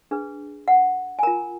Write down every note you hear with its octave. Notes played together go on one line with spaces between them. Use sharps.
D4 G#4 B4
F#5
G#5
F4 A#4 A#5